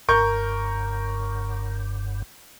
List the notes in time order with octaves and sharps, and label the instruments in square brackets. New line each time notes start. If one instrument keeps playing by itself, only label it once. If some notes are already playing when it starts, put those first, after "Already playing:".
[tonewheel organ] F#1 G2 [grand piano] A#4 C#6 G6